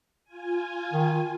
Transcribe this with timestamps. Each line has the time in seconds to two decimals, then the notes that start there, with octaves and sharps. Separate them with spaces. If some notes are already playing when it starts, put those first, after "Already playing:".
0.24 F4 G#5
0.93 D#3